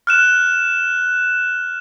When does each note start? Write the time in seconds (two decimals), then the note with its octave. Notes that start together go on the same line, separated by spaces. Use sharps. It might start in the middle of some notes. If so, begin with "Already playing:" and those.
0.07 F6 F#6 E7